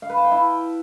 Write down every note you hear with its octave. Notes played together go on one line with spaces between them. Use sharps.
F5
B4
A5
G5
E4